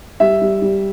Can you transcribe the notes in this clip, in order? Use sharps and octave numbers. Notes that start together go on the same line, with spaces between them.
G3 E5
G3
G3